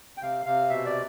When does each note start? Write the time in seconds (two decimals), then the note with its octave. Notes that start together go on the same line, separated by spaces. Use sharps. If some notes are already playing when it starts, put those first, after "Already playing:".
0.17 G5
0.21 C3 F5
0.45 C3 F5
0.69 B2 E5
0.85 D5